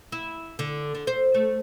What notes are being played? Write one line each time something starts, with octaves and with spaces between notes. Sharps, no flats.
E4
D3
D3
C5
A3